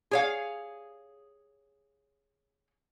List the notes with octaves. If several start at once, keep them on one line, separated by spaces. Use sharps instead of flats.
G#4 C#5 F5